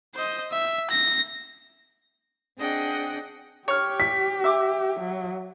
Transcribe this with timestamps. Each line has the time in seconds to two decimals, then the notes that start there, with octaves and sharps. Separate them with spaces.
0.15 C5 D#5
0.51 E5
0.91 A#6
2.58 C4 D4 G#4 D#5 F#5 G5
3.68 G4 C#5 F6
4.00 B6
4.44 E5 D6
4.99 F#3